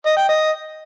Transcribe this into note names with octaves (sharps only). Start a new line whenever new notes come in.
D#5
G5
D#5